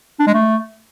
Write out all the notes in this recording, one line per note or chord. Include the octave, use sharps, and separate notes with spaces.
D4
G#3
A3